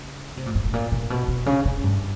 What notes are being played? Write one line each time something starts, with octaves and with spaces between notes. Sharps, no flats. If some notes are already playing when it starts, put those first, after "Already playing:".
Already playing: C#3
C3
A#2
G#2
A2
A#2
A#2
B2
B2
C#3
C#3
G2